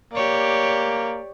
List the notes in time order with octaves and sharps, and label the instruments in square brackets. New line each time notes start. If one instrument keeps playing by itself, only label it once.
[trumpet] A#3 [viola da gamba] G4 C#5 D5